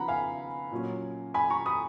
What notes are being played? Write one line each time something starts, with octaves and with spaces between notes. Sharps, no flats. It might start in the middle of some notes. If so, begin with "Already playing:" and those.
Already playing: C#3 F3 B3 D#4 F#5 A#5 B5
F5 G#5
A#2 F#3 C#4
G#5 B5
A#5 C#6
B5 D#6